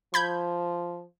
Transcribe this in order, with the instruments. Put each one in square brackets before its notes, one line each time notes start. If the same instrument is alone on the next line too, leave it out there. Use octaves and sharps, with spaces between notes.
[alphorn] F3 [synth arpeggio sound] B5 G6 G#6